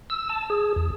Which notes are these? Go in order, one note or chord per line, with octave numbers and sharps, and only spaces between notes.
E6
A5
G#4
E2